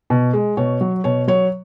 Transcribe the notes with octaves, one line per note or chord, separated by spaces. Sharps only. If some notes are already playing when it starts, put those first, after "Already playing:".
B2
G#3
B2 C#5
F#3
B2 C#5
F#3 C#5